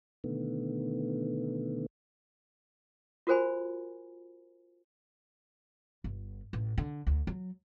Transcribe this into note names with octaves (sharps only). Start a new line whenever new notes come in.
B2 D3 D#3 A3 B3
F4 F#4 A#4 C5 G#5 B5
G1
A1
D3
D2
F#3